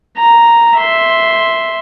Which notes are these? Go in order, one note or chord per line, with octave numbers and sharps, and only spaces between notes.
A#5
E5 C6